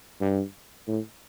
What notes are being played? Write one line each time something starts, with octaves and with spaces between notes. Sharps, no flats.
G2
A2